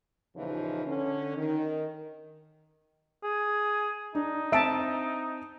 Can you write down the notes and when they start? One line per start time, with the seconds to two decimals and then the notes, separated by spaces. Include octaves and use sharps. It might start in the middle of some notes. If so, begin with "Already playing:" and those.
0.35 D#2 A#2 C#3 E3 F3 D#4
0.85 D3 C#4
1.37 D#3
3.23 G#4
4.15 D4 D#4
4.52 C4 E5 A5 D7